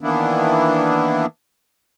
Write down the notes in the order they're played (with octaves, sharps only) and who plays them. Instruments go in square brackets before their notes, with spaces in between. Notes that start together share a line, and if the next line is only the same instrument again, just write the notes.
[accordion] D#3 E3 A#3 B3 D4 E4